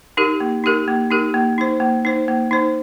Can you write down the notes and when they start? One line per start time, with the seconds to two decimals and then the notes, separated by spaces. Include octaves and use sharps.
0.17 D#4 G4 A#4
0.40 A#3
0.64 D#4 G4 A#4
0.88 A#3
1.11 D#4 G4 A#4
1.34 A#3
1.58 D#4 C5
1.80 A#3
2.05 D#4 C5
2.28 A#3
2.51 D#4 C5